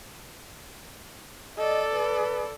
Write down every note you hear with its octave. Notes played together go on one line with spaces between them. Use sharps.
A4 D5 D#5
B4